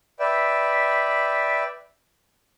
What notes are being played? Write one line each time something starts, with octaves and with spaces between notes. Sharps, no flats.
B4 D5 E5 G5